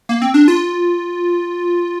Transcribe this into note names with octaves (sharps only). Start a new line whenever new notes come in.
A#3
C4
D4
F4